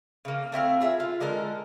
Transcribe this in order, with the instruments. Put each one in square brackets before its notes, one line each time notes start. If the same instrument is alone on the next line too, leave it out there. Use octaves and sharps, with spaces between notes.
[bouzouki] C#3 A#3
A3 C4 E4 F5
F4 G#4 E5
F4
D3 G#3 A4 A#4